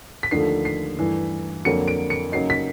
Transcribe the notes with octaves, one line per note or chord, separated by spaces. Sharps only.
B6
D#2 D3 F3 A3 C7
C7
G2 E3 A3
F2 D3 F#3 A#3 C#7
D7
C#7
C#3 F#3 A#3 D#4 C7
B6